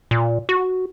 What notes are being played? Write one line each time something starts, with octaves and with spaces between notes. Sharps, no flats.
A#2
F#4